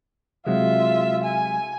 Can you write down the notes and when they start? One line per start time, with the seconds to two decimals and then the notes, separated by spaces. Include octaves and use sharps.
0.47 C3 F#3 G#3 F4 E5
1.24 G#5